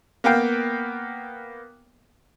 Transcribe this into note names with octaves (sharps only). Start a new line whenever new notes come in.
A#3 B3 F5 G5